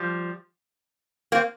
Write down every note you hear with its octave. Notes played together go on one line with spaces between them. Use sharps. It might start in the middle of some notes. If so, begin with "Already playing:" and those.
Already playing: F3 G3
A#3 C4